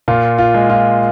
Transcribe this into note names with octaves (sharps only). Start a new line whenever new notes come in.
A#2 F4
F4
G#3
F4